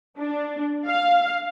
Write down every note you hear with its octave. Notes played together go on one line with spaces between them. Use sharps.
D4
F5